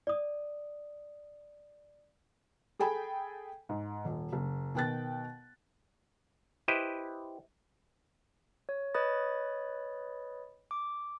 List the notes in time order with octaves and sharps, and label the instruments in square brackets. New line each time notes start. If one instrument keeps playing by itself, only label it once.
[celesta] D5 D#6
[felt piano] G#4 A4 G5 G#5 B5
G#2
D#1
F#1
B2 D#3 G5 F#6 A6
[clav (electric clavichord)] E4 G4 B4 C5 D#5
[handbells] C#5
B4 C#5 D#5 B5 D#6 A6
D6